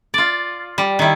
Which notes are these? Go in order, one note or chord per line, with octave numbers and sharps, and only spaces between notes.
F4 D5
G3
D#3 E4